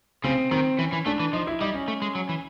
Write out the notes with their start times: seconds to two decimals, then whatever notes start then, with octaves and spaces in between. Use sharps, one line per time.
0.24 C#3 C4
0.51 D#3 C4
0.78 E3 C#4
0.93 E3
1.06 A3 D4
1.20 E3
1.33 F3 D#4
1.47 E4
1.61 G3 D#4
1.74 C#4
1.88 A3
2.02 G#3
2.15 F#3
2.29 E3